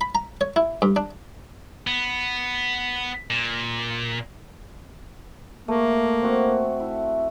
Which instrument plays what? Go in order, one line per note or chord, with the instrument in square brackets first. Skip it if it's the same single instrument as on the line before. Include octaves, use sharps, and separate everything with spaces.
[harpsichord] B5
A#5
C#5
E4
G2
D4
[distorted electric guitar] B3
A#2
[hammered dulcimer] A3 [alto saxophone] A#3
[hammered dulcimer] C4 F#4
E4